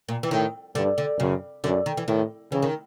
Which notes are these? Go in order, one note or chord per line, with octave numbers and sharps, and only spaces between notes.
A#2
E3
A2 D#3
G2 D3
D3
F#2 C#3
F#2 D3
D#3
E3
A2 D#3
C#3 E3
D#3